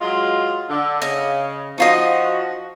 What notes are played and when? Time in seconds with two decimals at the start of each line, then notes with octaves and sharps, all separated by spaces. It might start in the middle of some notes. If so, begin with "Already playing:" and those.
0.01 F#3 G#3 F4
0.70 D3
1.02 C#3 D#5
1.78 F3 D#4 F4 F#4 D#5